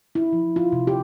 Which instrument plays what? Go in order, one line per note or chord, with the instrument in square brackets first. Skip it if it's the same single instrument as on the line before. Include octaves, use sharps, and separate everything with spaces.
[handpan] E4
F3
F4
C3
G4